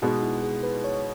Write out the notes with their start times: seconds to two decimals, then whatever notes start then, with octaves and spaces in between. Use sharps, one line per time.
0.02 B2 G#3 B3 D#4
0.23 E4
0.43 G#4
0.63 B4
0.84 C#5